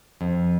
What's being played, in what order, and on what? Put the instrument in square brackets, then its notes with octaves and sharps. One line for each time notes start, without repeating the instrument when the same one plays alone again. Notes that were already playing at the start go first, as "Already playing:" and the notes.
[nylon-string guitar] F2